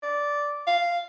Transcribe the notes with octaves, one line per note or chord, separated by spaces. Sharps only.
D5
F5